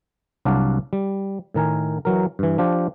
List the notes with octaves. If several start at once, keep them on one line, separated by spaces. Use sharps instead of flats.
C2 F#3 D4 F#4 D5 F5
G3
A2 D#3 A#4 G#5
E3 F#3 A#4
G2 E3
F3 D4 F4 G4